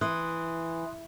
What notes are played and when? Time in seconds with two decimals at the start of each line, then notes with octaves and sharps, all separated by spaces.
0.01 E3 C6 D#6 F#6